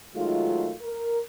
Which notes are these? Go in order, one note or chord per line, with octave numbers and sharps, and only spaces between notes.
D#3 F#3 G#3 A3 D#4 F4
A#4